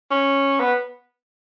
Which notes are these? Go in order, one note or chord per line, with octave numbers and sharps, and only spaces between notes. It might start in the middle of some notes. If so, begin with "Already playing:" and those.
C#4
B3